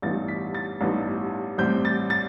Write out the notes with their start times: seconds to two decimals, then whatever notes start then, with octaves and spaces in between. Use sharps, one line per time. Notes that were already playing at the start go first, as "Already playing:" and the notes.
0.02 A1 G2 E3 B3 D#4 A6
0.28 B6
0.55 A6
0.81 A1 G2 E3 B3 D#4
1.58 A1 A2 G3 C4 G6
1.85 A6
2.10 A6